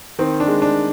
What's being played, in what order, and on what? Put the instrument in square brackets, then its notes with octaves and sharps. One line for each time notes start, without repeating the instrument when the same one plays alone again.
[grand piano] D#3 [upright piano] C4
[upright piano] D4
[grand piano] G#3
[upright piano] D4